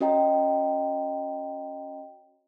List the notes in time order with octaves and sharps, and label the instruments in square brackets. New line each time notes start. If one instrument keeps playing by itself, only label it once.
[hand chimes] C#4 F#4 D#5 G5 A#5